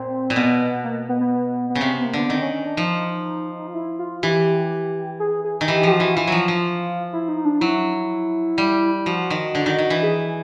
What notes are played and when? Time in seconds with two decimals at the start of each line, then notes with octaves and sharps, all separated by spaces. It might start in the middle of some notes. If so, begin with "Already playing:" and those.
Already playing: A#2 C4
0.30 A#2
0.36 B2 B3
0.84 A#3
1.09 B3
1.21 B3
1.70 B3
1.75 C#3
1.81 C3 C4
1.93 B3
2.05 A#3
2.13 D3 B3
2.29 D#3 C4
2.42 C#4
2.54 C#4
2.66 D4
2.77 F3 D#4
3.67 F4
3.74 E4
3.99 F4
4.23 E3 G4
5.20 G#4
5.44 G#4
5.61 D#3
5.68 E3 G4
5.83 F3 G4
5.92 F#4
6.00 E3
6.16 E3 F4
6.27 F3 F#3
6.48 F3
7.13 E4
7.29 D#4
7.45 D4
7.61 F#3 E4
8.58 G3
9.06 F3 F#4
9.30 D#3
9.55 D3
9.66 D#3
9.78 D#3
9.90 E3
10.03 G#4